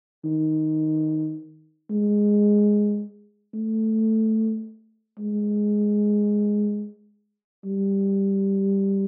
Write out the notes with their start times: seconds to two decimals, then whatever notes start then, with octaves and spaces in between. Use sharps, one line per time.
0.25 D#3
1.90 G#3
3.54 A3
5.19 G#3
7.65 G3